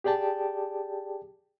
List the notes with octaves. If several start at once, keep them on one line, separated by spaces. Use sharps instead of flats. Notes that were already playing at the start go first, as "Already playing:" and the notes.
G4 G#4 D5 G5 A5